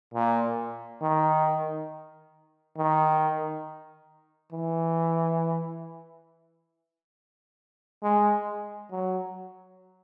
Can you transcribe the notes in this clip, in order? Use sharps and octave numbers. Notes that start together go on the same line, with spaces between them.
A#2
D#3
D#3
E3
G#3
F#3